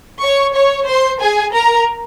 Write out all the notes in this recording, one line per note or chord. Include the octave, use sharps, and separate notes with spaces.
C#5 C#6
C#5 C#6
C5 C6
G#4 G#5
A#4 A#5